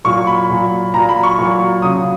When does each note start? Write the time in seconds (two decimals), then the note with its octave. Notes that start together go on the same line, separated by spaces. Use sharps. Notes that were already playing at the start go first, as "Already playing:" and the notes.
0.04 A#2 F#3 C#6
0.27 B5
0.49 A#2 F#3
0.94 A#2 F#3 A#5
1.09 B5
1.23 C#6
1.39 A#2 F#3
1.82 C#3 F#3 D#6